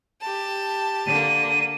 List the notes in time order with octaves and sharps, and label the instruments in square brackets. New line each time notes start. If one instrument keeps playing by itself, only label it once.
[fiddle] G4 A5
[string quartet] D3 A#3 [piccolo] D#7